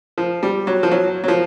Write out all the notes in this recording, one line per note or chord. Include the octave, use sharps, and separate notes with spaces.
F3
G3
F#3
F3
F#3
F#3
F3